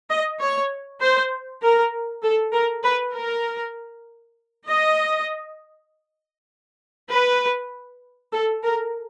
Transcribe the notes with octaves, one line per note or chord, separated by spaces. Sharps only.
D#5
C#5
C5
A#4
A4
A#4
B4
A#4
D#5
B4
A4
A#4